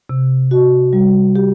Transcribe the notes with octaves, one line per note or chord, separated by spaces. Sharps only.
C3
F#4
G3
G4